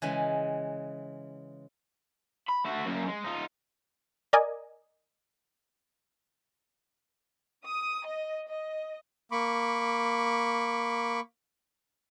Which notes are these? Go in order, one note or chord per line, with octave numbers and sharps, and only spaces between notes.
C#3 E3 G#3
B5
A3 F#4
F#2 A#3
G#3
D#4 F4
A#4 D5 D#5 G#5
D#6
D#5
D#5
A#3 B5 C#6 D6